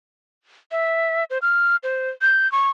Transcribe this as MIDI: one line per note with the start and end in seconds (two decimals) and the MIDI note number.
0.71 1.24 76
1.30 1.38 72
1.42 1.76 89
1.83 2.10 72
2.22 2.50 91
2.52 2.71 85